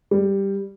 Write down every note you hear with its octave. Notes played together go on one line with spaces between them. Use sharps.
G3